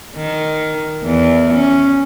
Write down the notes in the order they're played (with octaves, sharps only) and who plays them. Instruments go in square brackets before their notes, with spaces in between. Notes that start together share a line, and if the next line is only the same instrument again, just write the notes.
[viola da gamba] D#3
E2
C#4